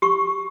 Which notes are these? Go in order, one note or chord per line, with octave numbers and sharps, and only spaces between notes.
G4 C#6